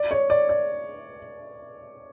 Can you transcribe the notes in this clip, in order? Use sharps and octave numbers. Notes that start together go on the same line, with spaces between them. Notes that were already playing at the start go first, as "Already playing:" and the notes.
Already playing: D5
C#5
D5
D5